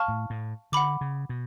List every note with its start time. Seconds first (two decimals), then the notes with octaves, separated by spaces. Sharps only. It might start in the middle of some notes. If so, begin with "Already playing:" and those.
Already playing: F5 A5 C#6 F6
0.08 A2
0.30 A2
0.72 D3 F#5 B5 D6
1.01 C#3
1.29 B2